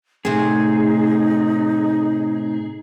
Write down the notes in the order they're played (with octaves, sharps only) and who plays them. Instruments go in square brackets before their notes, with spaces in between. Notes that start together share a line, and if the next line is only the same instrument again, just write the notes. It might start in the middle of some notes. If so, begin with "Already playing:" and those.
[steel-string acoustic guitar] A2 C3 [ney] D#4 [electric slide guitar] G#4